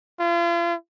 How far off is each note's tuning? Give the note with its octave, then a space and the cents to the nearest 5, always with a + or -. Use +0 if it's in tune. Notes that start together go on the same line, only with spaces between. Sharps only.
F4 -40